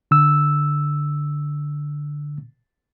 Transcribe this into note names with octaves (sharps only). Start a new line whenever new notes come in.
D3 E6